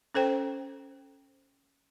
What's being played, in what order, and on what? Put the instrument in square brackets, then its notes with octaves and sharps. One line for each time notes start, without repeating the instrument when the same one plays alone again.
[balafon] C#4 A4 C5 G5